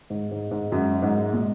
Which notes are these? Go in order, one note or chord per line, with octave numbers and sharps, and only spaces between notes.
G#2
G#2
G#2
F#2
G#2
A#2